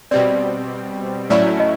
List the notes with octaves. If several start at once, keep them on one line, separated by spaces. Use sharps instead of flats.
B2 G3 C4 D5
A2 F#3 A3 C#4 E4 D5
D#5